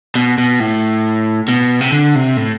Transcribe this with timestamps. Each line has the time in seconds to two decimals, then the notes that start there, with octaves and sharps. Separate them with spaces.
0.15 B2
0.38 B2
0.60 A2
1.48 B2
1.81 C3
1.92 D3
2.15 C3
2.37 A2